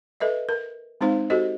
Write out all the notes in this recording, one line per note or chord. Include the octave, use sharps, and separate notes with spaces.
A4 B4 D#5 E5
A#4
G#3 C4 D#4 C5 F5
F#4 G4 A4 C5 D#5